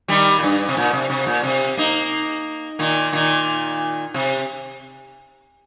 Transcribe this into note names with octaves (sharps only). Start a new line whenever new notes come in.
D#3 G3
A#2
G2
C3
A#2
C3
C3
A#2
C3
A#3 D#4
A#2 D#3
A#2 D#3
C3